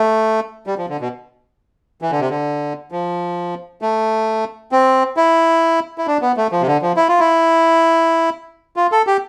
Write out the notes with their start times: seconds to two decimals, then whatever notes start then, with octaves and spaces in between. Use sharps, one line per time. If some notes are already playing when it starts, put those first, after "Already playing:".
Already playing: A3
0.67 G3
0.78 F3
0.89 D3
1.00 B2
2.02 E3
2.11 D3
2.20 C3
2.30 D3
2.92 F3
3.82 A3
4.72 C4
5.17 E4
5.98 E4
6.07 D4
6.22 B3
6.37 A3
6.52 F3
6.61 C3
6.67 D3
6.82 F3
6.96 E4
7.08 F4
7.20 E4
8.76 F4
8.92 A4
9.07 G4